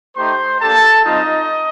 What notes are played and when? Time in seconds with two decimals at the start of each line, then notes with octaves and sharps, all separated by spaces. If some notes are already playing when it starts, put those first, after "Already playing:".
0.17 A3 D#4 G4 C5 C6
0.60 A#3 D4 G4 A4 A5
1.05 G3 C4 D#4 F4 D#5